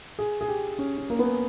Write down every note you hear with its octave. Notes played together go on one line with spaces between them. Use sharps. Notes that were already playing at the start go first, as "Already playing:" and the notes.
G#4
G#4
G4
C#4
C#4
A#3
B3